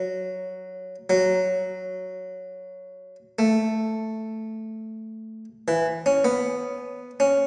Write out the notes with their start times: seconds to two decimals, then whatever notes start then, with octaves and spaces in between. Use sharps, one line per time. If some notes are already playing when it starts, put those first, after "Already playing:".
Already playing: F#3
1.10 F#3
3.39 A3
5.68 E3
6.06 C#4
6.25 B3
7.20 C#4